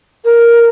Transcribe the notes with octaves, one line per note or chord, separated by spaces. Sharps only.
A#4